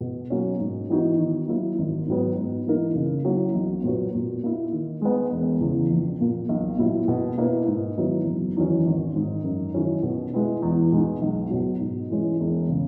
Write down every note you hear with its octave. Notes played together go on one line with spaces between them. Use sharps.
B2
F#3 A#3 C#4
G#2
E3 B3 D#4 F#4
D#3
F#3 A#3 E4
G#1
G#2 F#3 B3
G#2
E3 A#3 D#4 A#4
C#3
F#3 A#3 C#4 E4
B1
A#2 F#3 B3 F#4
A#2
A#3 E4
D#3
G#3 B3
E1
E2 C#3
A#1
A#2 A#3
B1
A#2 F#3 A#3 E4
B2
A#3 E4 B4
G#2
D#3 F#3 B3 E4
F#1
E2 D#3 F#3 C#4
G#1
G#2 D#3
F#2
D#3 F#3 C#4 E4
B2
G#3 B3 E4
E2
B2 G#3 D#4
B1
B2 F#3
G#2
E3 G#3 C#4
E1
C#3